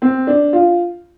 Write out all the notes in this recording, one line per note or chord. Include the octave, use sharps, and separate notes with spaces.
C4
D4
F4